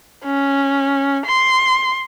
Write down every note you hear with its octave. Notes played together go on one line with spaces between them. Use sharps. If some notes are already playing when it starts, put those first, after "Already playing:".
C#4
C6